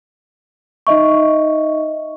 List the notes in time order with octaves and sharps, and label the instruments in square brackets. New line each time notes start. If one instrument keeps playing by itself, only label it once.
[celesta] D#4 D#5 E5 C#6